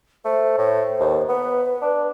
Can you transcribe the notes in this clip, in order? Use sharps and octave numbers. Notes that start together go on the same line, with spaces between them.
A3 C5
A2
D#2
B3 B4
D4